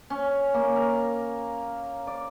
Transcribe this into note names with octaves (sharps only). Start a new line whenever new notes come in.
C#4
A#3
A#4
D5